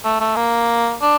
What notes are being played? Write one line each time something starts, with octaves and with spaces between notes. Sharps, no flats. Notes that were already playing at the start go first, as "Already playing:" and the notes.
A3
A3
A#3
D4